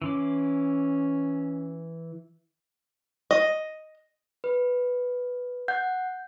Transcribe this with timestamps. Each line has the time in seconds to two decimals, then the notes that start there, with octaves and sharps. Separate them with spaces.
0.02 E3 C#4 C6 D6
3.31 D#5
4.44 B4
5.68 F#5 G6